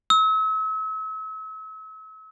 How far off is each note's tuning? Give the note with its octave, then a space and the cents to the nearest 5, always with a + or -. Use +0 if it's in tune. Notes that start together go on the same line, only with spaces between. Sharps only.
E6 -40